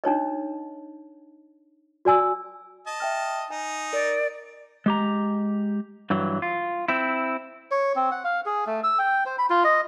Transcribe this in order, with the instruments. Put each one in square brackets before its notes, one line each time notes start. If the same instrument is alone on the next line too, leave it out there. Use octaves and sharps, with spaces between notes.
[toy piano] D4 D#4 C#5 D#5
F#4 D5 G#5 E6
[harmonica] D#5 A5
[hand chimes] E5 G5 F6
[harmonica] D#4 [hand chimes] G#5
[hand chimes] A#4 [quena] D5
[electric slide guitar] G#3 G4 A#5
G2 E3 F#3
F4
C4 E4
[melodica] C#5
C4
F#5
F5
G#4
A3
E6
G5
C5
B5
F4
D#5